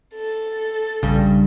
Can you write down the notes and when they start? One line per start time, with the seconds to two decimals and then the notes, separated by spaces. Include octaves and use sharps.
0.14 A4
1.03 A#1 G2 C#3